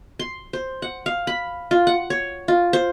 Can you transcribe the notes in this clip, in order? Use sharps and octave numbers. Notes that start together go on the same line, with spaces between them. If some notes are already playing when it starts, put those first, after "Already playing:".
C6
C5
F#5
F5
B5
F4
F#5
C#5
F4
C5